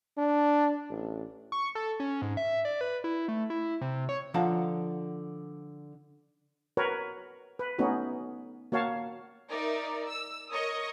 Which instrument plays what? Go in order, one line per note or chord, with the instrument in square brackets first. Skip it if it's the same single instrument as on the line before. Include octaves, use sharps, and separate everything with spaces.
[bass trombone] D4
A1
[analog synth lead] C#6
A4
C#4
G#2
E5
D5
B4
E4
A3
E4
C3
C#5
[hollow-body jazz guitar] D3 F3 F5 F#5 A5 A#5
[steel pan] F#4 A#4 B4 C#5
B4
A3 B3 C#4 D#4 F#4
A#3 F#4 C#5 F5 A5
[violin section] D#4 A#4 D5 E5
E6
A#4 C#5 D#5 C#6 D#6